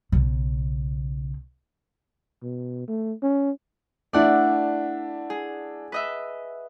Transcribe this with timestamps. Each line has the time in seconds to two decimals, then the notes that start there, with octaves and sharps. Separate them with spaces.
0.12 B1 C#3
2.43 B2
2.88 A3
3.23 C#4
4.13 A3 D4 E4 D5 F#5
5.30 G#4
5.92 B4 D#5 E5